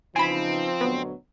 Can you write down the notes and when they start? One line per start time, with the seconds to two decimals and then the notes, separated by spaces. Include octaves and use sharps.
0.16 C#3 E3 F3 C4 D#4 G#5 B5
0.81 D2 B2 F#3 B3